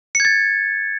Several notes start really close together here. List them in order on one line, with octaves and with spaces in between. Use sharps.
C#7 G#6 A6